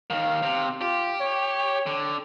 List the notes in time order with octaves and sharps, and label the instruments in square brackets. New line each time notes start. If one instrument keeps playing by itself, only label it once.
[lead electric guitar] D#2 D#3 [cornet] F5
[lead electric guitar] C3
[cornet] F4 [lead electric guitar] G4
[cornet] C#5
[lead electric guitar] D3